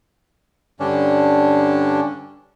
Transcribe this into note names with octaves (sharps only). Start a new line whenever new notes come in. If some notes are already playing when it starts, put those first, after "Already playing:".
G2 D3 C#4 D4